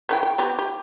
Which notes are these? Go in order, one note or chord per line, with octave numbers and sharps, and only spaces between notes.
C#3 E3 G5
G5
B3 C4 G4
G4